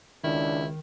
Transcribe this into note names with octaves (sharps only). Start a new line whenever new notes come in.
C#2 D#3 D4 E4